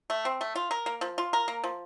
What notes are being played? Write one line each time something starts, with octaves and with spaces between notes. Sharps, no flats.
A3
C4
A3
F4
A#4
A#3
F3
F4
A#4
A#3
F3